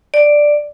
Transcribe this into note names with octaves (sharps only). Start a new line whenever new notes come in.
D5